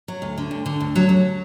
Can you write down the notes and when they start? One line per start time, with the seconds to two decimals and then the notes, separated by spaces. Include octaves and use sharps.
0.08 F#3
0.22 D2
0.38 D3
0.51 D2
0.66 D3
0.80 D2
0.96 F#3
1.09 F#3